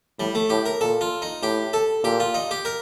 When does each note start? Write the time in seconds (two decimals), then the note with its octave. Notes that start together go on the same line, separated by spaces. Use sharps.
0.20 A2 G3
0.35 A3
0.50 A2 G4
0.66 A#4
0.81 A#2 A4
1.01 F4
1.22 D#4
1.42 A2 G4
1.73 A4
2.04 A#2 G4
2.20 F4
2.34 D#4
2.51 G4
2.65 A#4